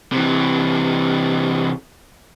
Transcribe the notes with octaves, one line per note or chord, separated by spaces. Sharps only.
C3 E3